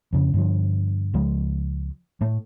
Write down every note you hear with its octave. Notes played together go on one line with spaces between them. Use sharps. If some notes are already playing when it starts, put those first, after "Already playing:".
F2 C#3
G2 D3 F3
C#2 F3 G#3
A2 A3